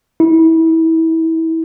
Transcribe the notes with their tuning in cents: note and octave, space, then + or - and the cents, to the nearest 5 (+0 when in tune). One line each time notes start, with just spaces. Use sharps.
E4 -30